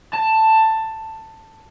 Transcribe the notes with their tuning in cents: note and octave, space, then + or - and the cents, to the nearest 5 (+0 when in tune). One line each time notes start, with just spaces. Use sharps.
A5 +10